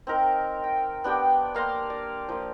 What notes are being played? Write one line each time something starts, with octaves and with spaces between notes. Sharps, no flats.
C4 D#4 A#4
G5
B3 D4 G4 G5
A#3 F5 A#5 C6
D5
F3 A#3